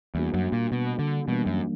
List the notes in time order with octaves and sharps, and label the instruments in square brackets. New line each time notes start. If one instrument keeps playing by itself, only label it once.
[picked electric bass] E2 [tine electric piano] G3 A#3 D4 F#4
[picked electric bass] F#2
A#2
B2
D3
[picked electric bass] B2 [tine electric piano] E3 G3 A#3 D4
[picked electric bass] F#2